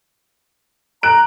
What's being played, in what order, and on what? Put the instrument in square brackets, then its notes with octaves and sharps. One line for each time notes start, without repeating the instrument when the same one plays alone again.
[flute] A#5 [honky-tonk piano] F#6 D7